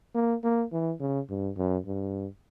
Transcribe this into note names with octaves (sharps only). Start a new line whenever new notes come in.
A#3
A#3
E3
C#3
G2
F#2
G2